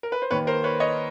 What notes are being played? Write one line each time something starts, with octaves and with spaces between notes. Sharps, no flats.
A#4
B4
C5
D#2 D#3 B4 C#5
A#4 C5
B4 C#5
C#5 D#5